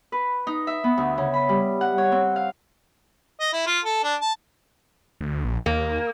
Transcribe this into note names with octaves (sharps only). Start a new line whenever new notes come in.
B4
D#4
E5
B3
D2
C#3
B5
G3
F#5
C#5
C4
F5
D#5
E4
F4
A4
D4
A5
D2
A#1
D#2 A#3